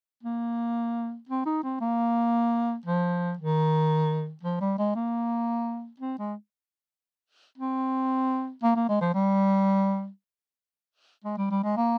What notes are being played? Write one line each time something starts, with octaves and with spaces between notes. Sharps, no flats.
A#3
C4
D#4
C4
A#3
F3
D#3
F3
G3
G#3
A#3
C4
G#3
C4
A#3
A#3
G#3
F3
G3
G#3
G3
G3
G#3
A#3